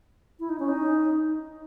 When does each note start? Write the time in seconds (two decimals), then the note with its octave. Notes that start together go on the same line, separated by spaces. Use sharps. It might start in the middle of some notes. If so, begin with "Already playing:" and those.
0.40 E4
0.49 D#4
0.59 C#4
0.69 D#4